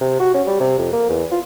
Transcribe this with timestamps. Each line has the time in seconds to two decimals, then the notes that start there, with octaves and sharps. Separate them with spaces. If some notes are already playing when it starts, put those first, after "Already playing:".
0.01 C3
0.20 F#4
0.34 C#4
0.47 G3
0.60 C3
0.78 F2
0.92 A#3
1.09 E2
1.32 F4